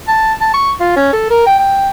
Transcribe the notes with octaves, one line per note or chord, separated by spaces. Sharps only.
A5
A5
C#6
F4
C#4
A4
A#4
G5
G5